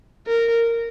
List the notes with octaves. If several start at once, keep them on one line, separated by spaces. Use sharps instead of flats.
A#4